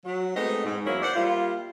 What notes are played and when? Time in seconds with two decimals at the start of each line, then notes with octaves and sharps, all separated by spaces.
0.05 F#3
0.35 G#3 A3 B3 C4 D#4 D#5
0.65 G#2
0.85 E2 F#3 A#3 C#4 E4 A#4
1.02 C5 D5 F#5
1.15 G3 A#3 E4 F4